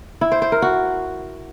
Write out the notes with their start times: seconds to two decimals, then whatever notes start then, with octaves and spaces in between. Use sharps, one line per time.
0.21 E4
0.32 C5
0.42 C5
0.52 A#4
0.62 F#4